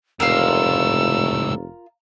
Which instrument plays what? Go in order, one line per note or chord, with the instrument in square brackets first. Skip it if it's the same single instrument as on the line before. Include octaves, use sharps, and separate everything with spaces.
[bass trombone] F1 [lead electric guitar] C#2 A2 [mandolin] F4 A#4 [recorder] E6